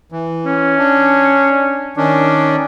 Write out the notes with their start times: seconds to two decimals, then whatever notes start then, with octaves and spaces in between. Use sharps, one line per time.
0.12 E3
0.46 C#4
0.78 D4
1.97 D#3 C#4 D4